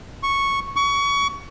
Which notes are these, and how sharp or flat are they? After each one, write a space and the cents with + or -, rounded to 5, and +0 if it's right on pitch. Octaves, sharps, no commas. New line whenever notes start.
C#6 -5
C#6 +25